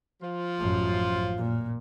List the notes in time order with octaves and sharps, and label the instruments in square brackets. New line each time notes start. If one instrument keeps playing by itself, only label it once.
[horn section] F3 F4
[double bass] A1 F#2
A#2